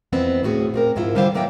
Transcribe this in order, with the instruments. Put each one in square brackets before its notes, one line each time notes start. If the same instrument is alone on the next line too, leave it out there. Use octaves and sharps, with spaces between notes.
[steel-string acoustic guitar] F2 E3 B3 C4
D2 A2 F#4 G#4
A#2 C4 A#4
D2 G#2 F3 E4 F4
D3 E3 G3 F4 C5 F5
F#3 A#3 B3 E5 G5